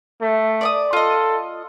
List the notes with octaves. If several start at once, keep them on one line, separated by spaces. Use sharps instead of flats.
A3
D5 D6 D#6
F4 A4 D#5